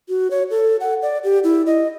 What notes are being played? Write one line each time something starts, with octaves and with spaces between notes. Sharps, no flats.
F#4
C#5
A4
F#5
D5
G4
E4
D#5